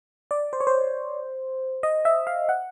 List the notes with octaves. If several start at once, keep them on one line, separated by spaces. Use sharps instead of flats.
D5
C5
C#5
C5
D#5
E5
F5
F#5